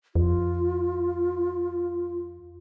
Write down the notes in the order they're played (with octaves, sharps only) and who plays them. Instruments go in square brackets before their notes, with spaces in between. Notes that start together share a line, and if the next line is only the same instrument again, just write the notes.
[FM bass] F2 [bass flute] F4